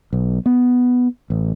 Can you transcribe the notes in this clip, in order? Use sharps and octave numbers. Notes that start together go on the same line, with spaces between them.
B1
B3
A1